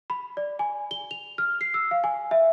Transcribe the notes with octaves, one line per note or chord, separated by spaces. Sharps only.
B5
D5
G#5
G7
F7
F6
C7
E6
F5
G#5
E5